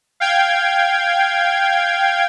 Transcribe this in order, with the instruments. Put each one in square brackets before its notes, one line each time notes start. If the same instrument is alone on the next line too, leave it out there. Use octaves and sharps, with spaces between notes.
[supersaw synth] F5 G5 G#6